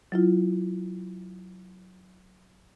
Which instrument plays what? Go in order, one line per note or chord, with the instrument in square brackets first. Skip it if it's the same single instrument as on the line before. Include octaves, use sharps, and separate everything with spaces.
[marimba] F#3 E4 F4